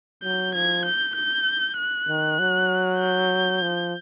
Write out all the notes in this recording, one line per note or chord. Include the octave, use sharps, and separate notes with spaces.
F#3 G6
F3 G#6
G6
G6
F#6
D#3
F#3
G6
F3